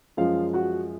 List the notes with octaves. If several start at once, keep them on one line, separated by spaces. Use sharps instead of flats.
F#2 F3 G#3 F4 F5
F#4 F#5